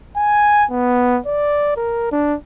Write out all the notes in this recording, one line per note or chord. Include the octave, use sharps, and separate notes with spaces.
G#5
B3
D5
A#4
D4